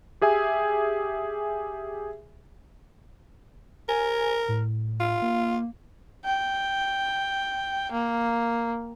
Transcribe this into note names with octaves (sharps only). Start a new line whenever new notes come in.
G4 G#4 E5 G#5
A#4 G#5
A2
F4
A#3
G5
A#3